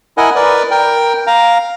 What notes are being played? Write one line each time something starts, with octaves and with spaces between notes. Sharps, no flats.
E4 A#4 D#5 F#5 G#5
A#4 B4 D5
A#4 G5
F5 A#5